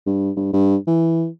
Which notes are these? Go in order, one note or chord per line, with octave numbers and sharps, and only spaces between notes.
G2
G2
G2
E3